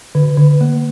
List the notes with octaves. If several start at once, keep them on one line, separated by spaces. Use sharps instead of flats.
D3
D3
A#3